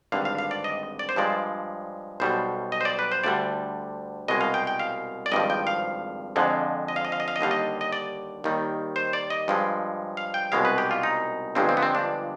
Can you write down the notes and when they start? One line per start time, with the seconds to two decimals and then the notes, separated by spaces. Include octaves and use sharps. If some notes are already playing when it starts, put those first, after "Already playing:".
0.12 G#1 G2 D3 F5
0.25 F5
0.38 F5
0.51 D5
0.64 D#5
0.99 D5
1.09 C5
1.16 G2 F3 G#3 D5
2.20 B1 B2 G3 C5
2.72 D#5
2.81 C5
2.85 D5
2.99 B4
3.12 C5
3.24 D2 D3 G3 D5
4.28 C2 B2 G#3 D#5
4.41 F5
4.54 G5
4.67 G5
4.79 F5
5.26 D5
5.32 G#1 G2 F3 D#5
5.50 G5
5.67 F5
6.36 F2 D3 F3 G#3
6.88 D#5
6.96 F5
7.05 D#5
7.12 F5
7.20 D#5
7.28 F5
7.36 D#5
7.41 D#2 D3 G3 F5
7.51 D#5
7.81 D#5
7.93 D5
8.44 D#2 D#3 G3
8.96 C5
9.13 D5
9.30 D#5
9.48 G2 F3 G#3
10.17 F5
10.34 G5
10.52 C2 B2 G#3 F5
10.65 B4
10.78 G4
10.91 F4
11.03 D#4
11.55 G1 G2 F3 G#3 C4
11.69 C4
11.77 B3
11.83 C4
11.95 D4